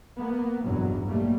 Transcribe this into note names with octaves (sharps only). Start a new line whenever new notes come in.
A#3 B3
A1 E2 G2 B2 F#3
B2 G3 A3 A#3